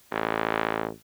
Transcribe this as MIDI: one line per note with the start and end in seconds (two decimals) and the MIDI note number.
0.11 0.89 33